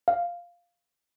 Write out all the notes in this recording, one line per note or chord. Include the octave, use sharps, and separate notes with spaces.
F5